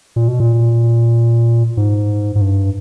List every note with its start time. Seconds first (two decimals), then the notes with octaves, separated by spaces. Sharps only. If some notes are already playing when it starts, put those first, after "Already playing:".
0.16 A#2
0.28 B2
0.40 A#2
1.77 G#2
2.36 G#2
2.41 G2